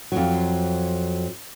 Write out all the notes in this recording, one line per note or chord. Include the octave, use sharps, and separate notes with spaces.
F2 F#3